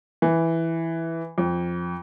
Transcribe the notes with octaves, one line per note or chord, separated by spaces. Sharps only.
E3
F2